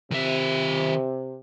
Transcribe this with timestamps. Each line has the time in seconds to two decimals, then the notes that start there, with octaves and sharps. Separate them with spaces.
0.11 C3 D#3 E5